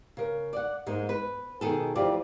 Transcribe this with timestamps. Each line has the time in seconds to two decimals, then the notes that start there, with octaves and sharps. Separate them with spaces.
0.17 C#3 A#4
0.53 D5 F#5
0.87 G#2 G#3 A#3
1.09 B4
1.61 B2 D#3 G#4 A4
1.96 D2 E3 F3 F4 G4 D5